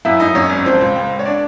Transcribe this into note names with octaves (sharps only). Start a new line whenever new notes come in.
F#2 E4 E5
F#2 D#4 D#5
F#2 C#4 C#5
G#1
F3 C4 C5
C#2
C#2
C#2
C#5
D4 D5